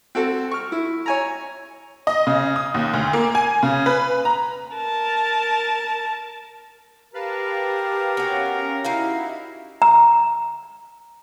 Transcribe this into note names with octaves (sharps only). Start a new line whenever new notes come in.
C4 F#4 A4
C#6 F6
E4
C#5 G#5 A#5
D#5
C#3
D#6
D#2
D2
A#3
G#5
C#3
B4
A#5
A#4 A5
G4 A#4 B4 F5 A5
B3 C#4 F#4 F5
D#4 E4 F#4 F5
A#5